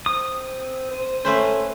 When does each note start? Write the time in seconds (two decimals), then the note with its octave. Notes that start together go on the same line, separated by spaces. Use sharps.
0.06 C4 D#6
0.91 C5
1.25 A3 C#4 B4 C5